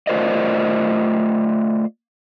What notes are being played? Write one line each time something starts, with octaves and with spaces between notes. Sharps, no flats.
A3 F4 A#4 C5 D5 D#5